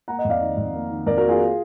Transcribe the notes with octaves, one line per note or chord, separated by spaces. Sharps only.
A#3 F#5 A#5
D#5 F#5
F2
D5 F5
D#3
F2
A#3
D#3
F2 A#4 D5
F#4 A#4
A#3
F4 G#4